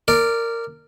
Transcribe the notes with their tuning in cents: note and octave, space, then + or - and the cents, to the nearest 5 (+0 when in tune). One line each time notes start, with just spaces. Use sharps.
A#4 -15 D5 +0